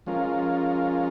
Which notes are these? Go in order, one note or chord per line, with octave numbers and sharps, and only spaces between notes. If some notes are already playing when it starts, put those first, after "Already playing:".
F3 G#3 C#4 F4 A#4